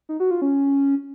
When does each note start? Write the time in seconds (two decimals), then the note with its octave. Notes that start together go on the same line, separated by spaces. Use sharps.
0.09 D#4
0.20 F#4
0.31 F4
0.42 C#4